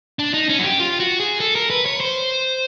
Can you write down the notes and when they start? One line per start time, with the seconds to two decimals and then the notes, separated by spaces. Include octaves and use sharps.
0.19 D4
0.34 D#4
0.49 C#4
0.59 F#4
0.64 G4
0.80 F4
1.00 F#4
1.20 G#4
1.40 A4
1.55 A#4
1.70 B4
1.86 C#5
2.00 C5